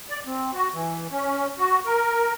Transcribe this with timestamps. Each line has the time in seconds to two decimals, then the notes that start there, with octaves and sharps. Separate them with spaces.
0.09 D5
0.26 C4
0.53 F#4
0.74 E3
1.11 C#4
1.58 F#4
1.86 A#4